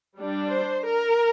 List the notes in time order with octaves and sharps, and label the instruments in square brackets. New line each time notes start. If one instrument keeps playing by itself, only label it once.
[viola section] G3 D4
C5
A#4